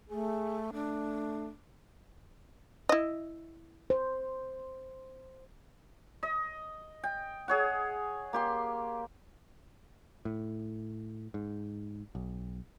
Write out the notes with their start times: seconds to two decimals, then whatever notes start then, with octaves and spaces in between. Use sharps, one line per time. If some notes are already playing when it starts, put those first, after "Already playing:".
0.10 A3 G#4
0.73 A3 D4
2.89 E4 D#5
3.90 C5
6.23 D#5
7.03 G5
7.48 G#4 C#5 F#5
8.33 A#3 G4 C6
10.25 A2
11.34 G#2
12.15 B1